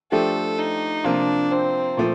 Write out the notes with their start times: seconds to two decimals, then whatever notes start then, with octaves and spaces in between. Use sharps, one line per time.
0.12 F3 A3 D4 G4 A4
0.58 D#4
1.04 C3 F3 A#3 D4 F4
1.51 C4
1.97 A#2 F3 A3